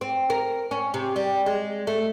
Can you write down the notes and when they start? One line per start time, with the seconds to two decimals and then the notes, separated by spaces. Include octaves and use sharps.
0.01 C4
0.30 A#4
0.71 C#4
0.94 C3
1.16 G3
1.46 G#3
1.87 A3